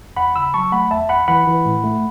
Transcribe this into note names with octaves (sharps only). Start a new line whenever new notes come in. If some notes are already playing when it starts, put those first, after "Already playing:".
E2 F#5 B5
C#3 B5 E6
F#3 A5 C#6
A3 F#5 B5
E2 E5 A5
E2 F#5 B5
E3 F#5 B5
E3
A2
A3